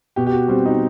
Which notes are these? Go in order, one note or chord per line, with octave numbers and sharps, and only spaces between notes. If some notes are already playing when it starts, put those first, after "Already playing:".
B2 G4
G4
F#4
G3 C4
D#4